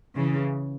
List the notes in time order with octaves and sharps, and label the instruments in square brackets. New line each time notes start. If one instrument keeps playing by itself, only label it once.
[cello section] C#3 E3